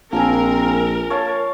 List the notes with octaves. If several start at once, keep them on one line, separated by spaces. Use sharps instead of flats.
A#1 F3 C4 A#4 G#5
C#5 F5 A5